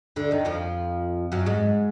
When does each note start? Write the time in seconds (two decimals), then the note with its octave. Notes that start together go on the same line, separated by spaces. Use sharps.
0.16 D2 D3
0.31 D#2 D#3
0.45 F2 F3
1.32 F#2 F#3
1.46 G#2 G#3